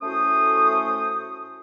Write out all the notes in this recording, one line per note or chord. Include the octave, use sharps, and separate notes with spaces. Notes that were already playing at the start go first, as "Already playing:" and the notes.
A2 A3 C#4 F#4 C5 D#6